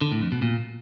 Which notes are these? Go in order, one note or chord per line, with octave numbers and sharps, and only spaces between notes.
D3
A2
F2
B2
A#2